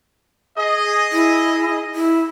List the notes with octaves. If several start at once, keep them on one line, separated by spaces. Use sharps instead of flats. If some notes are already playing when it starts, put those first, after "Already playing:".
G#4 D#5
E4
E4